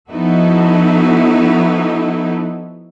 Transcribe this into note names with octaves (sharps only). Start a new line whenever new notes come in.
F3 B3 D#4 E4 F#4 A4